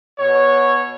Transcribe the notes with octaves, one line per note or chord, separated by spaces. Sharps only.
B2 C#5